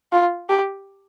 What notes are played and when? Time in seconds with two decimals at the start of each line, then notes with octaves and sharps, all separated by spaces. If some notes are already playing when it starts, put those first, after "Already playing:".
0.12 F4
0.49 G4